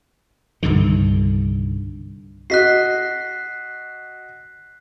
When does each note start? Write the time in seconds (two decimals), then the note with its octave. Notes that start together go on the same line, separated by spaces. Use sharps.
0.63 C2 G2 D3 D#3
2.50 F#4 D#5 F#6 B6 C7